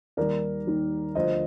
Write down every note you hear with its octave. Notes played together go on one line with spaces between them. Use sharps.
D#2 D#3 G3 A#4 D5
D#2 D#3 G3
D2 D3 F3 C5 D#5